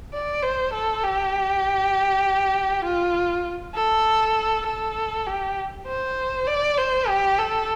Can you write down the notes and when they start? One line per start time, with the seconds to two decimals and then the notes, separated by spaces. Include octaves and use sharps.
0.13 D5
0.43 C5
0.73 A4
1.03 G4
2.84 F4
3.75 A4
4.66 A4
5.27 G4
5.87 C5
6.47 D5
6.78 C5
7.08 G4
7.38 A4